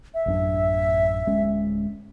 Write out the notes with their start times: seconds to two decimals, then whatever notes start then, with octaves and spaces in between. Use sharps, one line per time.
0.14 E5
0.26 A1 F#2 D4
1.26 D1 G#3 C#4